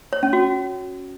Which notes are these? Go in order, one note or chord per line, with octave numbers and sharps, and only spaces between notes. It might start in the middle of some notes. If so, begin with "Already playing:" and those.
C#5
C#4
F#4